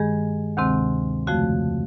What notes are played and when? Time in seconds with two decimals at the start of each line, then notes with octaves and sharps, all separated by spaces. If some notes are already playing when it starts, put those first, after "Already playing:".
Already playing: G2 D#3 G#3 G#4
0.57 D2 C3 D#3 G#3 C4
1.27 F2 C#3 F3 A3 F#4